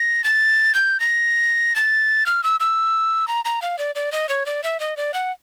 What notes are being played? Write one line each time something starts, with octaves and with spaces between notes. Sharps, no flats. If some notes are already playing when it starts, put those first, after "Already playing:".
Already playing: A#6
A6
G6
A#6
A6
F6
E6
E6
A#5
A#5
F5
D5
D5
D#5
C#5
D5
E5
D#5
D5
F#5